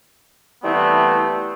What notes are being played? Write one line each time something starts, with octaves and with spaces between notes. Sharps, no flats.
E3 G3 A3 B3 C4